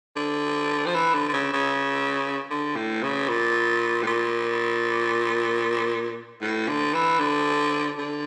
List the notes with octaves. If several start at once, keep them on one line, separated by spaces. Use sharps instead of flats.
D3
F3
E3
D3
D3
C#3
C#3
D3
A2
C#3
A#2
A2
A#2
A2
D3
E3
D3
D3